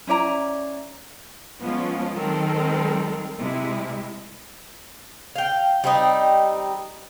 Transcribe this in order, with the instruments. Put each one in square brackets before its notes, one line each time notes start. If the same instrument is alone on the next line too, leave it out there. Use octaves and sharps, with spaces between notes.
[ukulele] C#4 E4 D5 A#5
[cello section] F3 G#3 B3 C#4 F4
D#3 F#3 G#3 C4 A4 A#4
C3 G#3 E4
[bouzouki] F5 G5
G3 C4 D#4